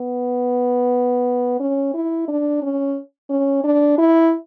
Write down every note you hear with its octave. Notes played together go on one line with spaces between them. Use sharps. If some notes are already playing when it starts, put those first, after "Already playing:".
Already playing: B3
C#4
E4
D4
C#4
C#4
D4
E4